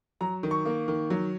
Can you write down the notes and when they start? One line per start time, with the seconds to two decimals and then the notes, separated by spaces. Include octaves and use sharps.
0.21 F#3 A#5
0.43 D#3
0.51 C#6
0.66 A#3
0.88 D#3
1.10 F#3